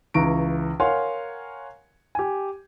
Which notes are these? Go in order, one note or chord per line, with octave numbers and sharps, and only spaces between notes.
C#2 E3 A#5 C#6 D7
A#4 C#5 F5 F#5 G#5 C6
G4 G#5